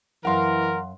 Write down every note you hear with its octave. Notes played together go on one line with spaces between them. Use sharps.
F#2 E3 A#4 F5 F#5 C6